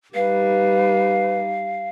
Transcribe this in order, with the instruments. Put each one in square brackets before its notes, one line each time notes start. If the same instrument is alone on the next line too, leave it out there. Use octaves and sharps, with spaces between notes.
[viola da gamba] G3 D#4 [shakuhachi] B4 [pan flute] F5